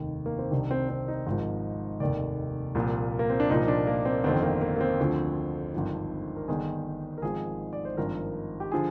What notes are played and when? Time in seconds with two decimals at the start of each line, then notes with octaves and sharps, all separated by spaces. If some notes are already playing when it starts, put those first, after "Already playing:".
Already playing: F1 D#2 D#3
0.26 A#3
0.38 C4
0.51 C2 C3 D#3 D4
0.71 C4
0.89 C4
1.08 D#4
1.27 G#1 G#2 F3
2.00 F1 D#2 D#3 D5
2.75 C2 A#2 F3
3.19 A#3
3.30 C4
3.40 D4
3.49 C2 A#2 F3 D#4
3.68 D4
3.87 A#3
4.05 C4
4.24 G1 F2 D#3 C4
4.43 A#3
4.61 A#3
4.76 A#3
4.80 C4
5.00 D2 D3 F3
5.74 G#1 G2 D3 F3
6.37 A#4
6.48 G1 G2 D#3 G#4
7.18 A#4
7.22 G#1 G#2 F3 G#4
7.73 D5
7.85 C5
7.97 G#1 G2 F3 A#4
8.60 G4
8.72 D3 F3 G#4